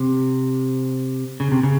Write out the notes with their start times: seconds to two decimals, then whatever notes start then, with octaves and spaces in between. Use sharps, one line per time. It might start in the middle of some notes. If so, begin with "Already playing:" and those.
Already playing: C3
1.40 C#3
1.51 C3
1.63 C#3